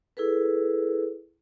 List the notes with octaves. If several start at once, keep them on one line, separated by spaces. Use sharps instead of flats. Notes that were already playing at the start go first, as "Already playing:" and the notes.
E4 G#4 A4 B4